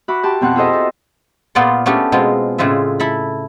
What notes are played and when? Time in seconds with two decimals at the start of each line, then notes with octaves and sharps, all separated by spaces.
0.08 F#4 E5 B5 D6
0.23 G4 A5 C6 D6
0.41 F2 B2 C4 F#5 F#6
0.56 F4 G#4 A4 C5 D#5 E5
0.73 A4
1.55 A#2 B3 F4 D5 F#5 C6
1.86 A3 B3 C#4 D4 G4
2.12 B2 G#3 C4 F4
2.58 A2 C#3 G#3 F4 E5
3.00 E4 A4 B5